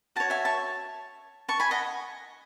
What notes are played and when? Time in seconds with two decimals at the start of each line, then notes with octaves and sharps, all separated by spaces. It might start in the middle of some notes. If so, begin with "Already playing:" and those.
0.16 F#4 C#5 F#5 A5
0.30 E5 G#5
0.45 A5 C#6
1.48 A5 C#6
1.60 G#5 B5
1.71 D#5 F#5